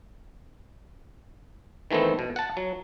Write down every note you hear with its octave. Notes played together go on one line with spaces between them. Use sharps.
D#3 E3 A3 B3 C4
B2
F#5 A5
F#3